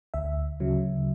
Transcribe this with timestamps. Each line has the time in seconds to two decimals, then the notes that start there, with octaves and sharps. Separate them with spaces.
0.14 D2 E5
0.60 C#3 F#3